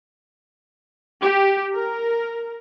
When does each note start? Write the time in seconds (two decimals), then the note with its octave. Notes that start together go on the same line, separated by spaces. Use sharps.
1.22 G4
1.73 A#4